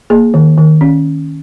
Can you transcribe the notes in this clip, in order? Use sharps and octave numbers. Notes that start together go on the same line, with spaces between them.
A#3 G#4
D#3
D#3
C#4